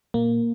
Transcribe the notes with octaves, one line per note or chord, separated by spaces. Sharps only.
A#2 A#3